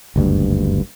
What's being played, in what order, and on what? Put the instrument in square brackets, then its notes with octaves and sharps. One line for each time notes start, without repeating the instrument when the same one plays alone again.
[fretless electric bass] F#1 D2 G2